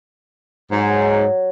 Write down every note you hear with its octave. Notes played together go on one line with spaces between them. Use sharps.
G#2 F#3